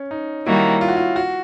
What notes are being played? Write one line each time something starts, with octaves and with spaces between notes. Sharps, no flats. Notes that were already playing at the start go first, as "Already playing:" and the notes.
Already playing: C#4
D#4
D#3 G3 A#3 D#4 E4 F#4
F4
F#4
F4
F#4